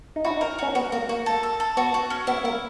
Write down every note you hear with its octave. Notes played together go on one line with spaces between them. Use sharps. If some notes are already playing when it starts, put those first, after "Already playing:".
D#4
E4 F#4
D#4
A#4
C#4 F#4
B3 F#4
A#3 F#4
A#3 F#4
A4
A4
A4
B3 F#4
F#4
C#4
B3 E4
A#3 E4